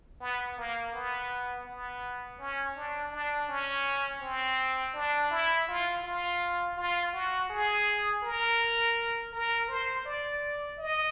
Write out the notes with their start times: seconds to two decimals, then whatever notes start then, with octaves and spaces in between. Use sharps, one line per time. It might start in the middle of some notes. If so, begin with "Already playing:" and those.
0.20 B3
0.57 A#3
0.93 B3
1.66 B3
2.39 C#4
2.76 D4
3.12 D4
3.49 C#4
4.21 C4
4.94 D4
5.31 E4
5.68 F4
6.04 F4
6.77 F4
7.13 F#4
7.49 G#4
8.23 A#4
9.32 A#4
9.68 C5
10.05 D5
10.78 D#5